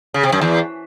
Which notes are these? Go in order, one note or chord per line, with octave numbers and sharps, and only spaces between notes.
C#3
C3
F#2
E2